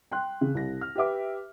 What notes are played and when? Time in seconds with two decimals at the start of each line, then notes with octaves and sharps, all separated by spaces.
0.11 G5 C6 F#6
0.41 C#3
0.55 C2 A#6
0.81 F6
0.95 G4 B4 E5 D6